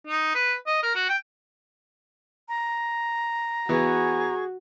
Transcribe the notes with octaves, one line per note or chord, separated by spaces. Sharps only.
D#4
B4
D#5
A#4
F#4
G5
A#5
E3 B3 F#4 G#4 C#6